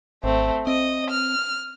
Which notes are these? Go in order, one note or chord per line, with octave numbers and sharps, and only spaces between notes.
G#1 A3 C4
C4 D#5
F6